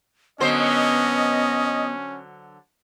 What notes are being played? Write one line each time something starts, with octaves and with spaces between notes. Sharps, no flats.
D3 F#3 B3 C#4 C5 D#5